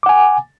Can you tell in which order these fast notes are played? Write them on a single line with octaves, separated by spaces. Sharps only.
D6 F#5 G#5